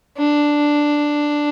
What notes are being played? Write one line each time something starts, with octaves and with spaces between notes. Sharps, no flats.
D4